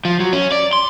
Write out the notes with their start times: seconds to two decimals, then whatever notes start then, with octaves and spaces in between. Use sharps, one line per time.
0.05 F3
0.20 F#3
0.33 C#4
0.52 D5
0.73 C6